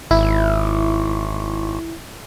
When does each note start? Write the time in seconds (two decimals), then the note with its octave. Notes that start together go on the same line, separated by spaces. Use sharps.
0.11 G#1 E4